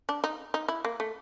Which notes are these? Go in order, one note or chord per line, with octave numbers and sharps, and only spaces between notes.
D4
D#4
D#4
E4
A#3
A3